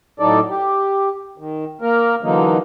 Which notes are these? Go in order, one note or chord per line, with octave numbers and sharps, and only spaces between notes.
A2 F#3 D#4 A4 D5
G4
D#3
A#3 A#4
D3 E3 F#3 A#3 D#4